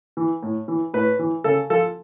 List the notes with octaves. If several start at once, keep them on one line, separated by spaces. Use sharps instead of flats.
E3
A2
E3
A2 B4
E3
C#3 A4
F3 A4